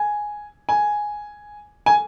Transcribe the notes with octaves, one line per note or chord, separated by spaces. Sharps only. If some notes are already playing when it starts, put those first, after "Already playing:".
Already playing: G#5
G#5
G#5